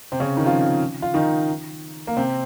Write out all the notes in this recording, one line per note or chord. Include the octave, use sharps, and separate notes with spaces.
C3 C4
C#3 C#4
D#3 D#4
F3 F4
F4
D#3 D#4
A#3
C3 C4